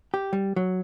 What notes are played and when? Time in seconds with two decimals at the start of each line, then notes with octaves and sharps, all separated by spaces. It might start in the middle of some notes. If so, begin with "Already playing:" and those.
0.14 G4
0.33 G3
0.56 F#3